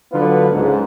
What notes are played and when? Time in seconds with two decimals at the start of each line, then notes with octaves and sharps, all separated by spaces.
0.12 D3 F#3 B3 F4 B4
0.51 C#2 G#2